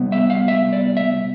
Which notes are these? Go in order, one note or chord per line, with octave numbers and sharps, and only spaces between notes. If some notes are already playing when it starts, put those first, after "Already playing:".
Already playing: C3 G3 B3
E5
F5
E5
D5
E5